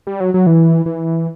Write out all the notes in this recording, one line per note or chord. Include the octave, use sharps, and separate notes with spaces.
G3
F#3
F#3
E3
E3